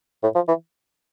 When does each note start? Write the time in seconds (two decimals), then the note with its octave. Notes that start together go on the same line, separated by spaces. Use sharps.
0.23 A2
0.35 F3
0.48 E3